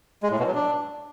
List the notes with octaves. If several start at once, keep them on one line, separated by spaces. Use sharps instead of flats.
G#3
A2
B2
F#3
D4